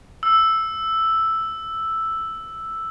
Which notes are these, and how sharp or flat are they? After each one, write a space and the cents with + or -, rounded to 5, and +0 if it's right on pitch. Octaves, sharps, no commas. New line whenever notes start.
E6 +0